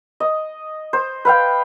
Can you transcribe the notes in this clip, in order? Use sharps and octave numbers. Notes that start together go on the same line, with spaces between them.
D#5
C5
B4 F5 G5